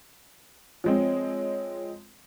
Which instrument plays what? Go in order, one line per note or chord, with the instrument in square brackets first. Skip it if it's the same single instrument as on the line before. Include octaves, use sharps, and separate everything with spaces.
[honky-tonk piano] F3 G#3 C4 [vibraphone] C#5